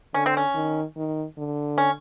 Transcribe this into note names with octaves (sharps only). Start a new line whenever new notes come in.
D3 C#4
C4
C#4
D#3
D#3
D3
C#4